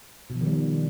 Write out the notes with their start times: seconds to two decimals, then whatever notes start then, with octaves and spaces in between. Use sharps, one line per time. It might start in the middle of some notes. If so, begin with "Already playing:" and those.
0.30 B2
0.35 F3
0.41 D#3
0.46 G3